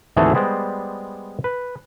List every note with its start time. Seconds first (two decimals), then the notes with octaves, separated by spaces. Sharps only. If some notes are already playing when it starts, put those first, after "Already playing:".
0.16 G#1 D2 E3 A3 G#4 A4
0.34 G3 G#3 B3 C5 D5
1.44 B4